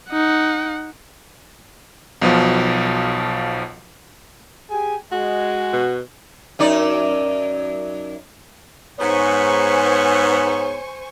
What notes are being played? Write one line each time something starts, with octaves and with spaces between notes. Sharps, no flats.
D#4 F#5
B1 B2 F3
G4 G#4 G#5
G#3 F#4
B2
F#2 D#4 D5
G#2 B3 C5 C#5 G#5 C#6